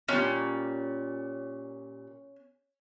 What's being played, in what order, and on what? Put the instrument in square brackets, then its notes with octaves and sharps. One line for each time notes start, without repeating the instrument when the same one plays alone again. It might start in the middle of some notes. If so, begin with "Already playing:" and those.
[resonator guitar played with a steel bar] A#2 G3 [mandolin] C#4